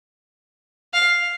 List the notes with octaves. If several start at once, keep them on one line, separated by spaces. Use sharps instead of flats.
F5